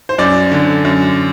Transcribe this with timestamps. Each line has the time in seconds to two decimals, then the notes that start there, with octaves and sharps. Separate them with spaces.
0.09 C5
0.18 F#2 D5
0.51 D3
0.85 F#2